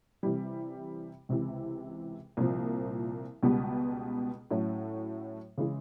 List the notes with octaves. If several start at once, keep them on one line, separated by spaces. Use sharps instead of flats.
C3 E3 G3
C#2 C3 E3
C2 A#2 F3
C#2 B2 G3 B3
A2 F#3 A3 C#4
C#3 E3 G#3